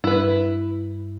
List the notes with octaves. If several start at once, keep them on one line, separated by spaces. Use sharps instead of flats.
G2 E4 B4